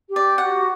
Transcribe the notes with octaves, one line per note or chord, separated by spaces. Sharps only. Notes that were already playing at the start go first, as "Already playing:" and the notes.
G4
D5
F#4 F#5